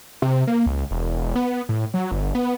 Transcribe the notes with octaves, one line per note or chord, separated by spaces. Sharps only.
C3
A#3
C#2
E1
B3
A2
F#3
G1
B3